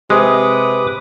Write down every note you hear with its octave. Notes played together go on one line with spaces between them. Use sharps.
C3 G#3 B4 D6 D#6